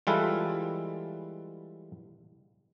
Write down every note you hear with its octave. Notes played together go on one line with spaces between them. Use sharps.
E3 G3 G#3 F4 A4 B4